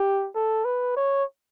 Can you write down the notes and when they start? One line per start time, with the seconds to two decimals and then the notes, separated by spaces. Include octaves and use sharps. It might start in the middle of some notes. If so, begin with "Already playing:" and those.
Already playing: G4
0.36 A4
0.65 B4
0.96 C#5